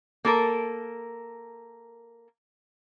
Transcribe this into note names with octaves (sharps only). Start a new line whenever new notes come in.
A#3 A4 A#4